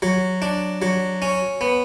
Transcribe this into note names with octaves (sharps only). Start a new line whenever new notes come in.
F#3
D4
F#3
C#4
B3